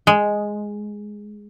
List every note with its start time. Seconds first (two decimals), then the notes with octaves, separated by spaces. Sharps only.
0.07 G#3